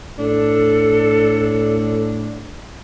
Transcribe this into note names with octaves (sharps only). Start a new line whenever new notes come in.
A2 D4 A4